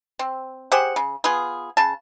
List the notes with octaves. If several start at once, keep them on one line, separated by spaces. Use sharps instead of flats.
C4
G4 G#4 C5 F#5
C#3
B3 F4 G#4
C#3 A5